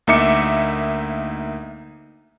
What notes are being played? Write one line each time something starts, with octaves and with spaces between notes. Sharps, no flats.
D2 A#3 D#4 E5 D6 C#7